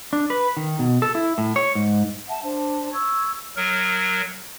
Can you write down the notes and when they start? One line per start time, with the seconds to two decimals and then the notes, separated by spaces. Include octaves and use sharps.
0.13 D4
0.30 B4
0.57 D#3
0.79 B2
1.02 A4
1.15 E4
1.38 A2
1.56 C#5
1.75 G#2
2.28 E5 F#5 A5
2.43 D4 C5 A5
2.93 C#6 E6 G#6
3.57 F#3 A#4